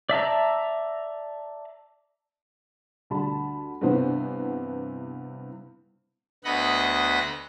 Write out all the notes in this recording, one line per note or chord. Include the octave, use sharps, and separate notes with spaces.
D5 E5 A5 A#5
D2 G3 A5 B5
G2 C3 E3 B3 C5
D2 B3 D#5 F#5 B5